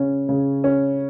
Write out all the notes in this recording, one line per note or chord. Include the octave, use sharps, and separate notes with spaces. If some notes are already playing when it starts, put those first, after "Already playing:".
Already playing: C#3 C#4
C#3
C#4